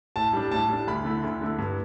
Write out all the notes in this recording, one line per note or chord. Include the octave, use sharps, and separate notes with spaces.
A2 A5
G3 D4
A2 A5
G3 D4
D2 B5
D3 A3 E4
D2
D3 A3 E4
G2